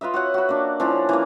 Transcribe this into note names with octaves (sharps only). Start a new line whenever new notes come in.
F4 B4 D#5 E5
F#4 C#5 F#5
F#4 B5
A#3 D4
F3 C#4 D4 E4
E3 A#3